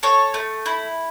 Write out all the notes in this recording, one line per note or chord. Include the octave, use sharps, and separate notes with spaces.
A4 C#5
A3
E4